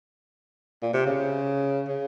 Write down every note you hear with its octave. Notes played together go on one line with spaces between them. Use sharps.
A#2
C3
C#3
C#3